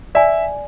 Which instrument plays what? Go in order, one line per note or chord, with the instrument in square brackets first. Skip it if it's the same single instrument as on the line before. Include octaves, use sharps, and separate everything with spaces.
[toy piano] D5 G#5 [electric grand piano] E5